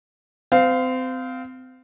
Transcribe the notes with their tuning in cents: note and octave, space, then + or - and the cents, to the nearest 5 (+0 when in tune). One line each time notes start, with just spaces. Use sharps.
C4 -30 F5 +0